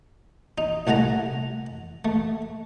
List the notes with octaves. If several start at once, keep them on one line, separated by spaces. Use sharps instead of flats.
D#4
C2 A3 F#5 G#5 A#5
A3